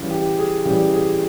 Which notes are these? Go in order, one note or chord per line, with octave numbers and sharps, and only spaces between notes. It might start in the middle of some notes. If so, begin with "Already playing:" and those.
Already playing: C#3 E3 G3
G4
G#4
C#3 E3 G3 G4
G#4